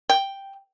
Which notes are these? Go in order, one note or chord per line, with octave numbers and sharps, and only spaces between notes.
G5